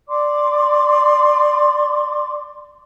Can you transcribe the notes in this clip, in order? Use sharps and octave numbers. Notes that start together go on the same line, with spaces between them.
D5 C6 D6